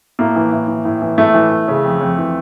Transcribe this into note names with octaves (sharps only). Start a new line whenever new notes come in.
A2 A#3
E3
A2
E3
A2
E3
A2 A3
E3
E3
C#3
F2
F2
E3